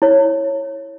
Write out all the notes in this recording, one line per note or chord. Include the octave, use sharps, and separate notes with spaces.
E4 C#5